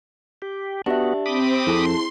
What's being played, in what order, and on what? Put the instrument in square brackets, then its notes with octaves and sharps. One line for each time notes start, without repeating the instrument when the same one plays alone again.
[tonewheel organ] G4
[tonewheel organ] B3 F#4 [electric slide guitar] D4 [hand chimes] G4 E5
[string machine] C4 [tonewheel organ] B5 D6 D#6
[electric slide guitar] F2 A4 [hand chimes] E4 G#4 [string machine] C6